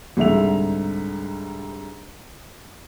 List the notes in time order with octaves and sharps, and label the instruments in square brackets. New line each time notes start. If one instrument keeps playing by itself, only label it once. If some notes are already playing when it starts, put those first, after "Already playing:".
[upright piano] C2 G#2 D3 E5 F7